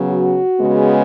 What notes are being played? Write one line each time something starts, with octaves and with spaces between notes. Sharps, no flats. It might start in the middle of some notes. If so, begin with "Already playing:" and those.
Already playing: C#3 F#3 B3
F#4
C#3 G#3 B3